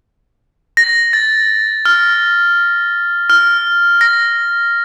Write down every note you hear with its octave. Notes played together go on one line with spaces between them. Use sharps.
A#6
A6
F6
F6
A#6